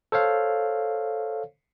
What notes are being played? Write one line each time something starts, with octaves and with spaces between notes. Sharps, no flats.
A4 C5 C#5 F5